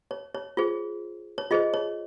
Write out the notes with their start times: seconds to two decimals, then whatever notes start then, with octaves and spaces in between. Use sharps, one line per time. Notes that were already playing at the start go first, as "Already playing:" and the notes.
0.11 C#5
0.34 C#5
0.57 F4 G#4 C5
1.38 C#5
1.51 F4 G#4 C5 D#5
1.74 C#5